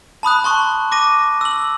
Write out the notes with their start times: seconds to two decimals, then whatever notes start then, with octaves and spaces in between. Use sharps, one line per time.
0.23 A5 B5 D#6 F#6
0.44 A5 C6 C#6
0.92 D6 A#6 D#7
1.41 E6 F#7